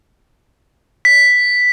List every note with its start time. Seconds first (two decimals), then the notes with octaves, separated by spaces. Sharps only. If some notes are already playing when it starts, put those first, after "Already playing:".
1.05 B6